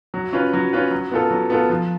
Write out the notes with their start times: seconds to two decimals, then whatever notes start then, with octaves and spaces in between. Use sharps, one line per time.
0.14 F#3
0.33 C#4 F4 B4
0.53 F#3
0.73 C#4 F4 B4
0.91 F#3
1.11 B3 F4 A4
1.31 F#3
1.50 B3 F4 A4
1.70 F3